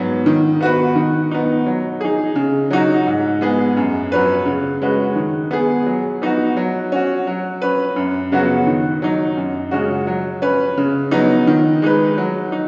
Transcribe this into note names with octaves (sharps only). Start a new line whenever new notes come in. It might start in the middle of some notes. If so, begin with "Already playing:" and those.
Already playing: G#2 F#3 B3
D#3
B3 F#4 B4
D#3
B3 D#4
F#3
D#4 G#4
C#3
F#3 D#4 F#4
G#2
G#3 B3 G#4
F#2
F#3 C#4 B4
C#3
G#3 C#4 F#4 B4
D#3
B3 G#4
F#3
B3 D#4 F#4
F#3
C#4 F#4
F#3
C#4 B4
F#2
C#3 F#3 B3 F#4
D#3
F#3 D#4
F#2
C#3 G#3 C#4 F#4
F#3
C#4 B4
C#3
F#3 B3 D#4
D#3
G#3 D#4 B4
F#3
D#4